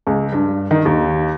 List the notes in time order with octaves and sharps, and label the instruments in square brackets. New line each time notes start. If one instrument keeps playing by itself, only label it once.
[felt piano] C#2
G2
D#3
D#2